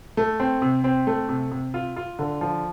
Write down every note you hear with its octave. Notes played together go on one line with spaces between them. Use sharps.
A3
C4
C3
C4
A3
C3
C3
F4
F4
D3
F3